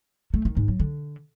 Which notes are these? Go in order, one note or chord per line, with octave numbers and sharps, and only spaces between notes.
A3
D#3
G#2
F#3
D3